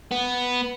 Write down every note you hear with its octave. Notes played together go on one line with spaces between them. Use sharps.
B3